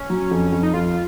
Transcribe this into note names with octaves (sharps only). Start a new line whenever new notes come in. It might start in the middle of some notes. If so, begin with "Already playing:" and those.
Already playing: C#4
F#3
F2
F2
D#4
F2 F4